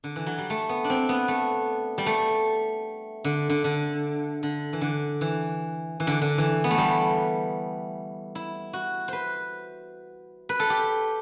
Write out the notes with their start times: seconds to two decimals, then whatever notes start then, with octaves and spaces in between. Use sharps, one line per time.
0.04 D3
0.16 E3
0.26 F#3
0.38 G3
0.50 A3
0.69 B3
0.84 D4
0.90 C4
1.09 B3
1.28 A3
1.98 G3
2.06 A3
3.24 D3
3.50 D3
3.64 D3
4.43 D3
4.73 E3
4.81 D3
5.21 E3
6.00 E3
6.07 D3
6.21 D3
6.38 E3
6.64 B3
6.71 A3
6.78 G3
8.35 E4
8.73 F#4
9.08 B4 C5
10.49 B4
10.60 A4
10.70 G4